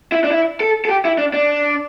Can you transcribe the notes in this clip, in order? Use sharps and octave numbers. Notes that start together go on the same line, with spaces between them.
E4
D4
E4
A4
A4
G4
E4
D4
D4